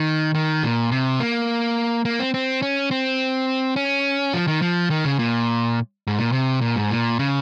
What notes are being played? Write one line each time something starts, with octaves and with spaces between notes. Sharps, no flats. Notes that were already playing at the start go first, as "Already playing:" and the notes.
Already playing: D#3
D#3
A#2
C3
A#3
A#3
C4
C4
C#4
C4
C#4
F3
D#3
F3
D#3
C#3
A#2
G#2
A#2
C3
A#2
G#2
A#2
C#3